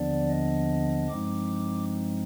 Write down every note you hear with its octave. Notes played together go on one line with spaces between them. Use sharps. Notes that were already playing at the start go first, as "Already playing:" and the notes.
Already playing: D#2 D3 F3 B3 D4 D5
D#5
G2 F3 G#3 C4 D#4 D6